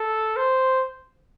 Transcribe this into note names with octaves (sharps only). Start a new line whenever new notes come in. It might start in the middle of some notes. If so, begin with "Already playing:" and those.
Already playing: A4
C5